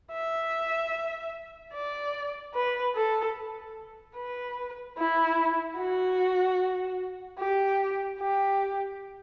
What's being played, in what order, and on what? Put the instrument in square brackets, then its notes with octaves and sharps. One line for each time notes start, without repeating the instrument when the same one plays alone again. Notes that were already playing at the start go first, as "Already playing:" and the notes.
[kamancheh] E5
D5
B4
A4
B4
E4
F#4
G4
G4